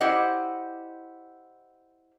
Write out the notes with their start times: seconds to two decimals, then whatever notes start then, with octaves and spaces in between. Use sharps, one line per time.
0.01 E4 G4 C5 D5 D#5 F#5